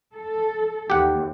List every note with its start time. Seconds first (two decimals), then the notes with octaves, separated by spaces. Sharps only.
0.14 A4
0.90 D#2 G4 F#5